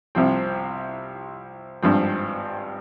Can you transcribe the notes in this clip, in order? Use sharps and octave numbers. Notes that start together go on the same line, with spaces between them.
C2 C3 F3 C4
G#1 G2 F3 C4